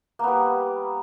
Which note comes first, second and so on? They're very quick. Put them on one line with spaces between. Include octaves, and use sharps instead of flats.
A#3 B3 G3